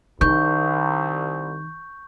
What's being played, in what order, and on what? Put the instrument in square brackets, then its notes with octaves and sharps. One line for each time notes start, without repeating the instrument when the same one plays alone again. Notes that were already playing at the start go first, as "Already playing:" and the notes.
[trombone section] C2 [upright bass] D#3 [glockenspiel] C#6 G6